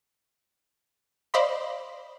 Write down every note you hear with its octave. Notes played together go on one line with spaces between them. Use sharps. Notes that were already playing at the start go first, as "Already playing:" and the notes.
C5 D5 D#5 F5 B5 C6